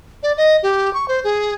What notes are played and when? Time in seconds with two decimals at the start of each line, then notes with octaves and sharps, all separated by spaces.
0.23 D5
0.37 D#5
0.63 G4
0.94 C#6
1.08 C5
1.24 G#4